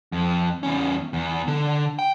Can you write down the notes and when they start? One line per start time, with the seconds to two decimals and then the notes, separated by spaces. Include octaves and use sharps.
0.12 F2
0.63 E2 C#4
1.13 E2
1.47 D3
1.99 G5